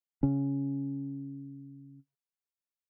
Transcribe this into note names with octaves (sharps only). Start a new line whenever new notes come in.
C#3 C#4